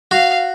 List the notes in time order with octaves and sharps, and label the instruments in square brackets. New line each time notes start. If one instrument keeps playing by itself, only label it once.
[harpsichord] F#4 [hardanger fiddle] F5